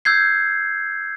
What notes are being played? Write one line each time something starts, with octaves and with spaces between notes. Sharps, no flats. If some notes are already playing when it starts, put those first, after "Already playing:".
E6 G6 G#6 C7